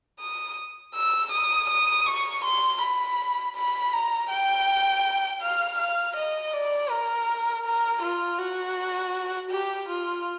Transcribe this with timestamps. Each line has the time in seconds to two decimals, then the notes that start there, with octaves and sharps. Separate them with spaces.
0.20 D#6
0.95 E6
1.32 D#6
1.70 D#6
2.06 C#6
2.45 C6
2.82 B5
3.56 B5
3.93 A#5
4.30 G5
5.42 F5
5.79 F5
6.17 D#5
6.53 D5
6.90 A#4
7.66 A#4
8.03 F4
8.39 F#4
9.51 G4
9.89 F4